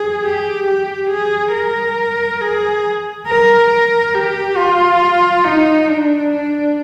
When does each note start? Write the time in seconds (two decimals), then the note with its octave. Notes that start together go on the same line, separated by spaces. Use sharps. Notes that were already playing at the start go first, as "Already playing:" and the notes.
Already playing: G#4
0.23 G4
0.67 G4
1.10 G#4
1.54 A#4
2.41 G#4
3.27 A#4
3.70 A#4
4.14 G4
4.57 F4
5.44 D#4
5.88 D4
6.31 D4